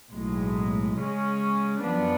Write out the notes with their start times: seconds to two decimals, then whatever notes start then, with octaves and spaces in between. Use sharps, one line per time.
0.11 B1 A2 G#3
0.97 C#3 G#3 C#4
1.82 F#2 F3 B3 D4